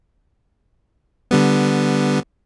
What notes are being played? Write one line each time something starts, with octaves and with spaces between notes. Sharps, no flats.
D3 G3 B3